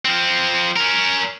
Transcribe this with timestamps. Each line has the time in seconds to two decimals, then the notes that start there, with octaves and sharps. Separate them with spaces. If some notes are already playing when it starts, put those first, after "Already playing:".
0.05 F3 C4
0.76 C#4 A#4